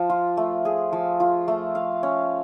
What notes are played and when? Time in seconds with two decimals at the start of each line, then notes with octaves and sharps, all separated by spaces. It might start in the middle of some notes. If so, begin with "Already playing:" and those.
Already playing: F3
0.10 F4
0.37 A3
0.65 G#4
0.93 F3
1.20 F4
1.48 A3
1.75 F5
2.03 C#4